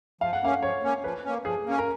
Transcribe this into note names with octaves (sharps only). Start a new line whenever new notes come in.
F3 F5
F#5
A#3 C#4 F5
F3 C#5
A#3 C#4
F3 B4
A#3 C#4
F3 G#4
A#3 C#4
A#4